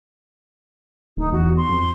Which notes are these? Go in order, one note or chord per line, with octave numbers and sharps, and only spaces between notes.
D1 D#4
E2 F#4
C6
F2